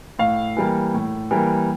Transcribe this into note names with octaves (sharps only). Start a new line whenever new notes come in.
A2 F5
E3 G3 A#3
A2
E3 G3 A#3